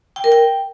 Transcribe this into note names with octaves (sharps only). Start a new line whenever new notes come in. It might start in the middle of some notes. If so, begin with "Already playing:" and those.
G5
A#4
G5